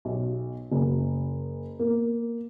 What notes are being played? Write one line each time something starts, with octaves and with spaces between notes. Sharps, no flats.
B1
F#1
A#3